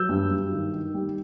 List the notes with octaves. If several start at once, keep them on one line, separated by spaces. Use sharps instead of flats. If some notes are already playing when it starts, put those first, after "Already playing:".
Already playing: F#3 E6 G6
G2
G2
D#3
D#3
G3